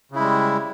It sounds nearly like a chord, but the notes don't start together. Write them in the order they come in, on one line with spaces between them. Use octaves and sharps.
C#3 E4 G#3 G3